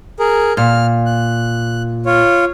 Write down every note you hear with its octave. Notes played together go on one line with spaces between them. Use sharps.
G#4 A#4
A#2 F6
F#6
F4 C#5